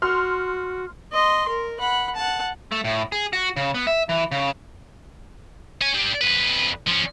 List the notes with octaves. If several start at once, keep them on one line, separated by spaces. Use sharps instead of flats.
F#4 C6 F6
D#5 C6
A#4
F#5 B5
F#5 A5
A3
A2
G#4
F#4
C#3
B3
E5
E3
C#3
C#5 G#5
D4 G4
F2 B4
F3 C#4